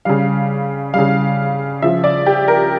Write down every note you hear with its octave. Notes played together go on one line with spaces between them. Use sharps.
C#3 G3 F5
C#3 G3 F5
C#3 F3 E5
D5
G4
A#4